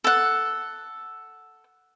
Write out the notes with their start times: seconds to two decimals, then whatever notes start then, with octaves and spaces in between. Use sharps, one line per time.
0.04 A4 F#5